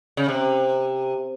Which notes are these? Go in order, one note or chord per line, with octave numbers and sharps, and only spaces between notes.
C#3
C3